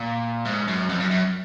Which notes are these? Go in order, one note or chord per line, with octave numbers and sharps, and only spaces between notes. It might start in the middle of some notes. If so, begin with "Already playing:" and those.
Already playing: A#2
G#2
F#2
F2
F#2
F#2